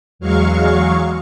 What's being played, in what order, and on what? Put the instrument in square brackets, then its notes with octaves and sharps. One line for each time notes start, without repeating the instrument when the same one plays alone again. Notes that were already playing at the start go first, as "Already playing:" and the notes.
[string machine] E2 F#3 G#3 F5 C#6